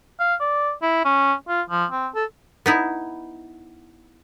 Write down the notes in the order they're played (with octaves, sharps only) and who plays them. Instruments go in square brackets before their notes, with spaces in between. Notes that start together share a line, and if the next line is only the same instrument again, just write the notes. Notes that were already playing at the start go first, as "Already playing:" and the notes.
[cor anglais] F5
D5
E4
C#4
F4
F3
C4
A4
[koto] B3 D#4 E4